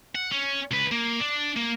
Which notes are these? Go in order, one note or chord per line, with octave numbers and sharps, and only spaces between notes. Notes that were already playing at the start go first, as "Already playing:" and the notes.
F#5
C#4
C#2 B4
A#3
D4
A#3